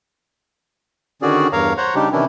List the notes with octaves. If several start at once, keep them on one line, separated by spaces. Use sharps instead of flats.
D3 D#3 C#4 F#4 G#4 D5
E2 G2 A#4 C#5 F5 A#5
C5 C#5 F#5 A#5
C#3 G3 D4 D#4 G4
C3 D#3 E3 C#4 D4 E4